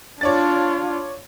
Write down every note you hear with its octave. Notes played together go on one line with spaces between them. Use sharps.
D4 F4 C#5 D5 A6